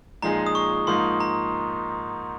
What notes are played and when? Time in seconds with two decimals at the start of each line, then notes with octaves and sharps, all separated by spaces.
0.22 A#2 F3 G#3 D#4 G#4 A#5
0.46 D#6
0.55 C#6
0.87 G#2 F3 A#3 D#4 C6
1.20 A#5